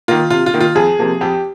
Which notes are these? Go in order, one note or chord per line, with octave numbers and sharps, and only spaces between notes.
D#3 A#3 F4
C3 F4
F4
D#3 A#3
F4
F2 G#4
C3 F3 A#3
F2 G4